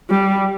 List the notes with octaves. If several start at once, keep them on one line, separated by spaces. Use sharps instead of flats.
G3